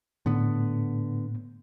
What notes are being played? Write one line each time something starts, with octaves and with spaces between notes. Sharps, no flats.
A2 D3 B3